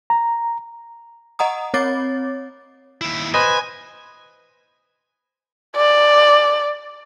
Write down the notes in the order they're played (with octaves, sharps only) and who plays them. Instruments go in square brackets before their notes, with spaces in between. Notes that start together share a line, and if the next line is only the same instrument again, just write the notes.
[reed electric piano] A#5
[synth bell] D#5 F#5 A#5 D#6
C4 C#5 D6 A6
[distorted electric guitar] D#2 E4
[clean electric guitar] B4 C5 D#5 [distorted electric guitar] G#5
[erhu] D5